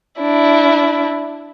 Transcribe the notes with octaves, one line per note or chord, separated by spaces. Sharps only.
D4 E4